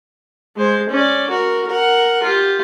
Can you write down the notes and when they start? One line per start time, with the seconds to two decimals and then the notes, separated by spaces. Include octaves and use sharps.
0.56 G#3 C5
0.89 C#4 D5
1.29 F#4 A#4
1.67 A#4 F#5
2.23 F4 G4